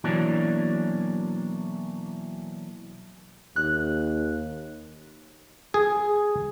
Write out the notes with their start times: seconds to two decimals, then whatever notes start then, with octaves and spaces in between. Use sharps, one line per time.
0.04 B2 E3 F#3 A#3 D4
3.56 D#2 F#6
5.74 G#4